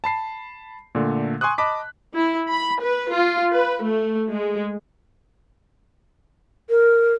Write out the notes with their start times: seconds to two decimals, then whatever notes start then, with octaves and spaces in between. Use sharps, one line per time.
0.04 A5 B5 C7
0.95 A#2 D3 A3
1.41 G#5 C6 C#6 D#6 F#6
1.58 D#5 A5 B5 D6 B6
2.14 E4
2.50 B5
2.81 B4
3.13 F4
3.52 B4
3.82 A3
4.31 G#3
6.70 A#4